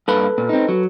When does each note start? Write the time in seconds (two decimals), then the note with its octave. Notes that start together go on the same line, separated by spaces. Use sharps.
0.08 G2 A#3 A4 B4 B5
0.38 A#2
0.49 C4 D#4
0.68 F#3